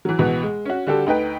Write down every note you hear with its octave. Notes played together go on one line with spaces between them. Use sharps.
E3 F#3
C#2 B2 E3 B4
G#3
C#4 F#4
D3 G3 F#4 G4 A4
D2 D#4 B4 G5